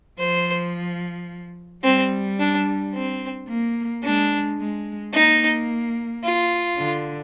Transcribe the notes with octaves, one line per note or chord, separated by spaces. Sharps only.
F3 C5
G3 C4
D4
C4
A#3
G#3 D4
G#3
A#3 D#4
F4
D3